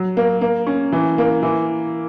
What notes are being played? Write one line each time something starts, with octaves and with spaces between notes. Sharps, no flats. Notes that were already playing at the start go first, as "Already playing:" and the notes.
Already playing: F#3
A#3
A#3
C#4
E3
A#3
E3